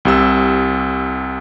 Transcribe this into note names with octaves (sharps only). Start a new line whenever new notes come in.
C2 C3 E6